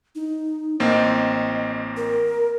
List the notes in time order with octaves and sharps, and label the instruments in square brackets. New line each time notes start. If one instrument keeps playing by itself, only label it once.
[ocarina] D#4
[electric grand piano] A1 A#3 C4 [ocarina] D#5
[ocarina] A#4